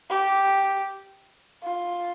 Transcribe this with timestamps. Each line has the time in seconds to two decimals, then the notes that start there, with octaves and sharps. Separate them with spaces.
0.10 G4
1.62 F4